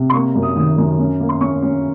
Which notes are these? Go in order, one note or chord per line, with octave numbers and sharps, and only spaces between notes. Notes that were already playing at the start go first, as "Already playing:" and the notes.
Already playing: C3
C6
A#3 C#6
F#2
D#6
D#3 D#6
F#2
C#4
A#3
C6
C#4 C#6
C#4